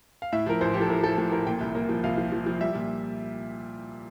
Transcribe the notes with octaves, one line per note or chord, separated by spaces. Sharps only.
F5
A2 E5
F3 A#4
A1 C5
F3 G4
A4
A2 A#4
F3 A4
A2 A4
A1 A#4
A#2 G5
C2
A#3
F3
C2 F5
F3
F3
F3
G3 E5
A#2